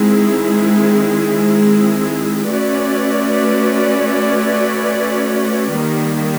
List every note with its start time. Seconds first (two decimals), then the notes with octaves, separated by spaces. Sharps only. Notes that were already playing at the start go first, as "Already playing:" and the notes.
Already playing: D#3 G#3 C4 E4 G#4
2.50 A3 C#4 F#4 B4 D5
5.70 D#3 G3 A#3